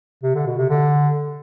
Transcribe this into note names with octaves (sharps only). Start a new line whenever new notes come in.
C3
D3
B2
C3
D3